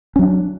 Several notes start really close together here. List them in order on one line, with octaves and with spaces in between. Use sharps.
C#4 F#3 D4